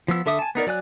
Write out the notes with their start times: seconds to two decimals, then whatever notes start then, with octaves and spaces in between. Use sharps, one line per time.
0.08 F3 B3 E6
0.26 D3 A4 E5 D6 D#6
0.39 G#5 A5
0.55 B3 D#4 A#4 D5
0.67 F#3 D5 G#5 F#6